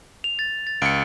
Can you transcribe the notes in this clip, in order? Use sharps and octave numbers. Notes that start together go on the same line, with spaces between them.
F7
A6
A6
C#2 C#7 D7